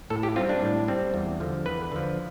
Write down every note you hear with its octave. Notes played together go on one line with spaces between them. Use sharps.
A2 A4
G4
G3 C4 F4
D4
A2
G3 C4
E2
D3 F3
E2 B4
D3 F3